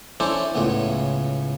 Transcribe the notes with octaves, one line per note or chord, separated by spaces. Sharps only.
C#4 D4 E4 A4 C5 D5
C#2 A2 C#3 B3